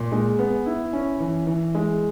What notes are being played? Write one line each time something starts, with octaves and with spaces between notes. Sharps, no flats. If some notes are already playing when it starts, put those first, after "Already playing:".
Already playing: A#2
G#3
B3
E4
C#4
E3
E3
G#3